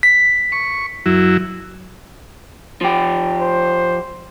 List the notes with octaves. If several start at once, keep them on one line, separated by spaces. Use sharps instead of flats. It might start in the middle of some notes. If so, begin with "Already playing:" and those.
B6
C#6
F#2 F#3 E4
F3 G4
C5